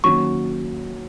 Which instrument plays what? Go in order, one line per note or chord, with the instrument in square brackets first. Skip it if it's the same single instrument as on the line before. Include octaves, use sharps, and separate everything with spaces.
[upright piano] D#3 F#3 A#3 C#4 [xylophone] C#6